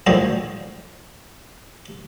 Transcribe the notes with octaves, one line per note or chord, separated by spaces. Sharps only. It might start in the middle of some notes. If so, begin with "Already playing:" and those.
A2 D3 D#3 F3 F#4 G#4